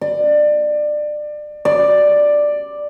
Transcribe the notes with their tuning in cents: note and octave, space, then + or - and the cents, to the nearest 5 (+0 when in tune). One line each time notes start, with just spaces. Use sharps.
D5 +25
D5 +5